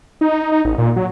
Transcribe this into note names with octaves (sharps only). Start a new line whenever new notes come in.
D#4
D#4
A1
A#2
F#3